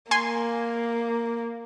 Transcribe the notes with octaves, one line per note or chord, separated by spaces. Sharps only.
A#3 G#5 C6